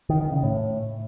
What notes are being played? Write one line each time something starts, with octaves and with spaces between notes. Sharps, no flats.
D#3
D#3
C#3
A2